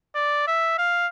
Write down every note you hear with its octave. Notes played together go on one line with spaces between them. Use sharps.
D5
E5
F5